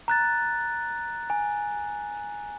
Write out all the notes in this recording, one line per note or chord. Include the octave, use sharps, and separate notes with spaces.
A#5 F#6 A6
G#5